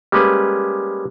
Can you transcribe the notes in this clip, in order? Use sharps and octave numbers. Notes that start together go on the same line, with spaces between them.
G3 G#3 A#3 C#4 B4